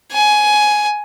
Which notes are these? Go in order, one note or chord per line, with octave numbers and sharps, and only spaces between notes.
G#5